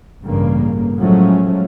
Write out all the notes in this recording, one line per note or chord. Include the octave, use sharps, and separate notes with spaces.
A1 G2 C#3 A#3
A2 F3 F#3 G#3 A3 C#4